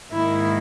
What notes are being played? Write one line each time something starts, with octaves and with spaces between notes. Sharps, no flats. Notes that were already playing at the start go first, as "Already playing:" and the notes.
G#2 D#3 A#3 E4